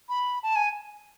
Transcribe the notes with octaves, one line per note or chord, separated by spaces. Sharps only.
B5
A5
G#5